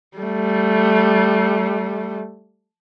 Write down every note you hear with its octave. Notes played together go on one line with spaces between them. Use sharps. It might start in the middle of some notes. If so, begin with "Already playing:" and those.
G3 A3